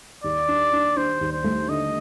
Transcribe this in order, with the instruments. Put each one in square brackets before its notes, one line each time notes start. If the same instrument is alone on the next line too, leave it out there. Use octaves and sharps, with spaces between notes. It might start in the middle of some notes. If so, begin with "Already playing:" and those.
[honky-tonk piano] D#2 [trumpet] D5
[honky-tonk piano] D4
D4
[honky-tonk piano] D4 [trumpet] C5
[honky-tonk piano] D#2
[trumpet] C5
[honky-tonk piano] A3
[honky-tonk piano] D3 [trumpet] D#5